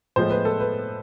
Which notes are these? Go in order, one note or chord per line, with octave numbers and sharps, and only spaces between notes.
A2 F3 G#3 C5
B4
A4
B4